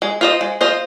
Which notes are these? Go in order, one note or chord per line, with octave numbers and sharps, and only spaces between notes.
G#3
F4 C5 D#5
G#3
F4 C5 D#5